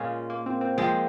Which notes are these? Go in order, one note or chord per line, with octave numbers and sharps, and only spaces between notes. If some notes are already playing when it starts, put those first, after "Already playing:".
Already playing: A#2 G#3 C#4 F4
A#3
C4
C4
F3 G#3 A#3 C4